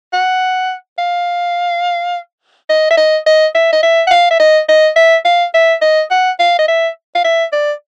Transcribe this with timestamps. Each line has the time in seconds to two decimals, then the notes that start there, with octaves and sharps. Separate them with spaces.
0.13 F#5
0.98 F5
2.69 D#5
2.91 E5
2.97 D#5
3.26 D#5
3.55 E5
3.73 D#5
3.83 E5
4.07 F#5
4.11 F5
4.31 E5
4.39 D#5
4.69 D#5
4.96 E5
5.25 F5
5.54 E5
5.81 D#5
6.11 F#5
6.39 F5
6.59 D#5
6.68 E5
7.15 F5
7.24 E5
7.52 D5